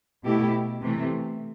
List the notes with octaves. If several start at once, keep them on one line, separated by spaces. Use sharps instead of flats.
B2 A3 E4 G4
C3 E3 A3